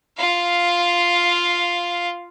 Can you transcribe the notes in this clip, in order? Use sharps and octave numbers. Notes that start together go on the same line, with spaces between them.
F4 F5